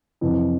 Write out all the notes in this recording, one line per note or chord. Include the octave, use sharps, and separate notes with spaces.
F2 C3 E3